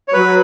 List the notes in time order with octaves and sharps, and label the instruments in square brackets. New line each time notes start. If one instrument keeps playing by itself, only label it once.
[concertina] C#5
[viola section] F#3 [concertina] B4